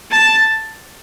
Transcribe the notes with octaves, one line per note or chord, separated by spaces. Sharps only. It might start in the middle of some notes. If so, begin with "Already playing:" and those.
A5